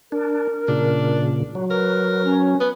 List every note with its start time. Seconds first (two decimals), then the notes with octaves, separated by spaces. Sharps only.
0.12 D4 A#4
0.68 A#2 C#3 D4
1.55 F#3
1.70 A#4 B4
2.25 C#4
2.60 B3 B4